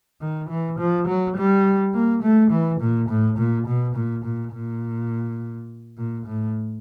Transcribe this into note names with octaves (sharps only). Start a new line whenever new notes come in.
D#3
E3
F3
F#3
G3
A#3
A3
E3
A#2
A2
A#2
B2
A#2
A#2
A#2
A#2
A2